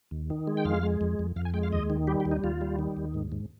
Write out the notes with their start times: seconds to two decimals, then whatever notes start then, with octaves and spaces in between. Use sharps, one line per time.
0.11 D#2
0.30 D#3
0.47 G#3
0.57 G5
0.65 F2 F5
0.83 G#3
1.01 F2
1.19 F2
1.36 F2 F5
1.45 G#5
1.54 G#3 G5
1.63 F5
1.72 D#2 D#5
1.90 D#3
2.07 G3 G4
2.20 G4
2.25 D#2
2.31 D#4
2.44 D#2 F4
2.61 G3
2.79 D#3
2.97 D#2
3.14 G#2
3.32 G#2